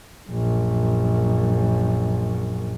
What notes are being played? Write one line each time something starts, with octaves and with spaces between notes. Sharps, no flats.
A#1 F#2